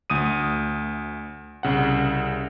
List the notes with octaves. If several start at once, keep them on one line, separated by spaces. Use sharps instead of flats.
D2 D#6 D#7
C2 C#3 F#5